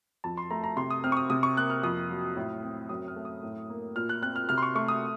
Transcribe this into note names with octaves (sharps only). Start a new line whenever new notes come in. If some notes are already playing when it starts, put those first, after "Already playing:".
F2 A5
C6
A3 A#5
A#5
C3 C6
D#6
C4 F6
C#6
D#6
C3 D#6
C#6
A#3 F#6
F6
F2 D#6
F#3
A2
C4
F#2 D#6
F6
A3
D#6
A2
A#3
A#2 F6
F#6
C4 F#6
F6
C3 F6
C6
C#6
A3 C#6
D#6